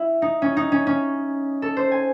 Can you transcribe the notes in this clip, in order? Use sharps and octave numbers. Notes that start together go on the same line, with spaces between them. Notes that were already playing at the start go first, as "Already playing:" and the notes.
Already playing: E4
D#4
C#4
D#4
C#4
C#4
A4
C5
G#5